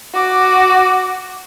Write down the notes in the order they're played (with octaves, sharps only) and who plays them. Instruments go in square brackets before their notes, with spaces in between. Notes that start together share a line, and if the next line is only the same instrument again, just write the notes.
[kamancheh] F#4 D6